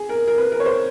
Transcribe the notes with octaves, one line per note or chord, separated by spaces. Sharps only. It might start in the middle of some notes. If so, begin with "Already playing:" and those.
Already playing: G#4
A#4
A#4
B4
A#4
C#5
C5